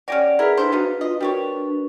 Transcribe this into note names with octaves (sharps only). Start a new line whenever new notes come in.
C#4 G4 C#5 D5 F#5 A#6 D7
E4 G#4 A#4 B4
D4 E4 A4 B4 C5
B3 D#4 F4 F#4
F4 D#5
G3 D4 F#4 G4 A#4 C#5 C#6